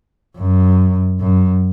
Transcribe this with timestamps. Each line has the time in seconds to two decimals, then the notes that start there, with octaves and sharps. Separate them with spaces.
0.38 F#2
1.20 F#2